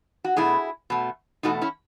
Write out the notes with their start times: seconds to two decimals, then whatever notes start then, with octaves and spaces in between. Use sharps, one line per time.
0.24 F#4
0.36 B2 A3 E4 G#4
0.90 B2 A3
1.43 E2 B2 A3 D#4 F#4
1.62 C#4 E4